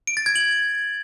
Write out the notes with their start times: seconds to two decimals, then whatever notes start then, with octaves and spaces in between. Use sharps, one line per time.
0.07 D7
0.17 A6
0.26 G#6
0.36 F#7